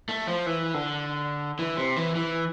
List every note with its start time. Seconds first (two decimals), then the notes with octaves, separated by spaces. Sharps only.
0.09 A3
0.27 F3
0.46 E3
0.74 D3
1.59 E3
1.77 C3
1.96 E3
2.15 E3